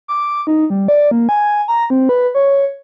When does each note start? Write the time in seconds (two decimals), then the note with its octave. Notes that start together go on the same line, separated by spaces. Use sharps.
0.08 D6
0.47 D#4
0.70 G3
0.88 D5
1.11 A#3
1.29 G#5
1.68 A#5
1.90 C4
2.09 B4
2.35 C#5